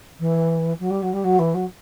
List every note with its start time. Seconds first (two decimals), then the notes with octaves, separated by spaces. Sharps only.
0.19 E3
0.80 F#3
0.90 G3
1.02 F#3
1.13 G3
1.24 F#3
1.39 E3
1.54 F#3